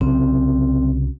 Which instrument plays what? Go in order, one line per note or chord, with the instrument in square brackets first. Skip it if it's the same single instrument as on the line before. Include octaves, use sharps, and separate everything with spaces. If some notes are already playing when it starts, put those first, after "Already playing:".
[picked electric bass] C2 C#3 F#3 [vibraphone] C4